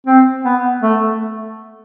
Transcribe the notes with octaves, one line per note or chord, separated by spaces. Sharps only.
C4
B3
A3